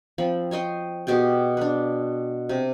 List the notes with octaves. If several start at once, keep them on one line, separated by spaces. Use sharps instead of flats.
F3 C4 B5
C#5 D#5 G5 C6
B2 G4 G#4 G5
D4 B4
C3